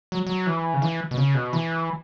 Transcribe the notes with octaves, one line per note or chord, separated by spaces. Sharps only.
F#3
F#3
E3
C#3
E3
B2
C#3
B2
E3